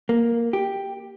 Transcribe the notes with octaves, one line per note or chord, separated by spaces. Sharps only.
A#3
G4